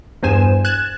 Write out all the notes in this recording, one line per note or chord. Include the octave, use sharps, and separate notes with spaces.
E2 G2 C5 G#5 E7
F#6 G#6 A6 E7